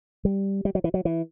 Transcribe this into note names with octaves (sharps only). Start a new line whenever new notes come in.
G3
G3
F#3
E3
F#3
E3